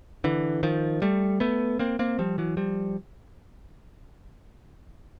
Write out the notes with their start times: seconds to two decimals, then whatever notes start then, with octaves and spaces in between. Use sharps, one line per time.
0.24 D3 E3
0.63 D#3 F3
1.02 G3 A3
1.40 A3 B3
1.79 A#3 C4
1.99 A#3 C4
2.19 F3 G3
2.38 E3 F#3
2.57 F3 G3